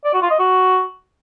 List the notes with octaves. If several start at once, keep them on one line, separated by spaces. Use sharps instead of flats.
D5
F#4
F4
D#5
F#4